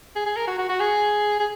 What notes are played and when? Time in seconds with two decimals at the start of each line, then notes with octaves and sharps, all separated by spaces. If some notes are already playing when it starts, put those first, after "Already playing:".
0.16 G#4
0.26 G#4
0.37 A#4
0.47 F#4
0.59 F#4
0.69 F#4
0.80 G#4
1.40 G#4